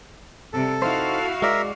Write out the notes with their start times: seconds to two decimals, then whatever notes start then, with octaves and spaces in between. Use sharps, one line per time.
0.53 C3 G3 A4
0.82 D#4 E4 F#4 C5 F5
1.42 G#3 A#4 D5 E5